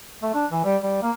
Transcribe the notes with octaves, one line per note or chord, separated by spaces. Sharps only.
A3
D4
E3
G3
G3
A#3